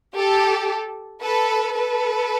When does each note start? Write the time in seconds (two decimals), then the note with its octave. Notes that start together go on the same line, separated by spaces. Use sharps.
0.18 G4 A4
1.23 A4 B4
1.75 A4 B4